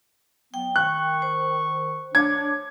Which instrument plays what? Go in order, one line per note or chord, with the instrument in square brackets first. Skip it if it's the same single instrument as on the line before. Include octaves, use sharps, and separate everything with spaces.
[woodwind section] F#3 B3 [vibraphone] G5
[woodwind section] D#3 C#6 [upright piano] F#6
[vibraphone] C5
[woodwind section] D4 [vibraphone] C#5 D6 [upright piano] G#6